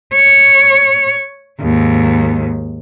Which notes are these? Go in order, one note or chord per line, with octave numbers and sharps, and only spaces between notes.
C#5
D#2 G#2